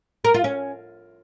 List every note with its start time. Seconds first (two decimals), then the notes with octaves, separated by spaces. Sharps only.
0.25 A#4
0.34 F4
0.44 C#4